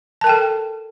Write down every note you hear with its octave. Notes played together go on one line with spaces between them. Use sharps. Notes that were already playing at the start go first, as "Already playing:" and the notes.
A4 A#4 G5 A5